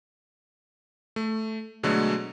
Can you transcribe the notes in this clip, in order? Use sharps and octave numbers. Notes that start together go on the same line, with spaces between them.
A3
B2 D3 F#3 G#3 A3